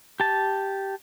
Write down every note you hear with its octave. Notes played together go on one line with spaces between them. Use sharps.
G4 A5